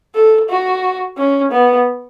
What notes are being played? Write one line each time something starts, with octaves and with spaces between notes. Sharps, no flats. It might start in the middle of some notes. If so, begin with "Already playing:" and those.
A4
F#4
C#4
B3